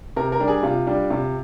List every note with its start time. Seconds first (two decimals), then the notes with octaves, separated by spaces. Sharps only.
0.16 C3 A#4
0.32 A#4
0.40 G3 D4
0.48 G#4
0.63 C3 F4
0.87 G3 D4
1.10 C3